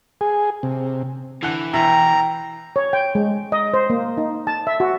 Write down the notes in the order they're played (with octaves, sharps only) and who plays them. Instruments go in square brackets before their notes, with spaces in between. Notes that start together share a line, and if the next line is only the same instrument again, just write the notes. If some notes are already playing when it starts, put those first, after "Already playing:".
[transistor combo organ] G#4
C3
[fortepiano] D3 F#5 [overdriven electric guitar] E3
[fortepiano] E2 B2 E4 [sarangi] G5 [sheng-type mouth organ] A#5
[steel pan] C#5
G5
G#3
D#5
C5
A#3
D#4
A5
E5
F#4